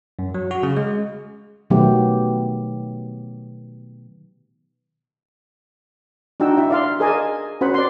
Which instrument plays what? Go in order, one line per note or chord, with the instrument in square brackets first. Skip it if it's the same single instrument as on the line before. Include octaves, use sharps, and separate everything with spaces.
[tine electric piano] F#2
F#3
F#4
C#3
G#3
[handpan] B2 D#3 F#3 A3 B3 G4
[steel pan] D4 D#4 F#4 G5 E6
E4 E5
D5 F5 C6
G#4 A#4 D5 D#5 G#5 A5
C#4 F#4 A#4 C5 F#5 B5
D5 C6